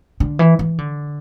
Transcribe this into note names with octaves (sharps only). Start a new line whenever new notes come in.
D3
E3
E3
D3